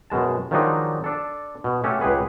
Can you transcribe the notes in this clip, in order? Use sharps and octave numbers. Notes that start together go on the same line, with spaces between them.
F#2 B2 G#3 A5
D#3 F3 F#3 G#3 D4 D#4
D4 A4
B2
A3 C#4 F#4 G4 A4
C#2 G4 G#4 B4 F#5